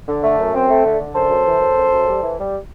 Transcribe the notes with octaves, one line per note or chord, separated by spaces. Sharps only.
D3
A3
F#2
C4
A3
D3
D3
F#2 A4 C5
F#2
E3
F#2
F#2
F#2
G3
E3
G3